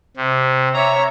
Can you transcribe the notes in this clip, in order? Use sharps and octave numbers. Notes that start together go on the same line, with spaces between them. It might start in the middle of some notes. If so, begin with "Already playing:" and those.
C3
C#5 E5 A#5